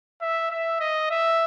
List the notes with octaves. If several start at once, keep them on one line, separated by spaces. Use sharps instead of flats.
E5
E5
D#5
E5